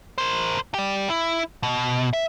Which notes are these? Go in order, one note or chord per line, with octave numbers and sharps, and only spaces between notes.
A#4 C5
G4 D5
E4
B2
E5